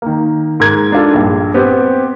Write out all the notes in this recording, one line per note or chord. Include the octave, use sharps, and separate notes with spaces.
D#3 A#3
G#2 A#4 G#6
D4 D#4 F4 A4
A#1 G2
B3 C4 G4